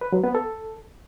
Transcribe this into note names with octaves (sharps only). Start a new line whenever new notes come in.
B4
F#3
B3
A4